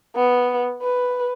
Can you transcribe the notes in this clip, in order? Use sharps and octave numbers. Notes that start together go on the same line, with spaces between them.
B3
B4